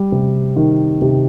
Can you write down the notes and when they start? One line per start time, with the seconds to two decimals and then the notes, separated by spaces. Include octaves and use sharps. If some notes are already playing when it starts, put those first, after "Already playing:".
Already playing: G3
0.12 C3
0.56 D#3
1.02 C3